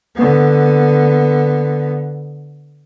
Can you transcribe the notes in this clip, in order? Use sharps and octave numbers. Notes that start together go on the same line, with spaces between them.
D3 B3